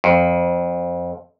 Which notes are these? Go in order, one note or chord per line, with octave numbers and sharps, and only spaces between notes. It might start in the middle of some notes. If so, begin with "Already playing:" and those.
F2